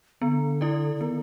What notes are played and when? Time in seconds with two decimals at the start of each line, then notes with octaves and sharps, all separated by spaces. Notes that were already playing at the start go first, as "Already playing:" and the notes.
0.22 D3 B3
0.61 E4 A4 D5
0.95 D3
1.01 D#3 B3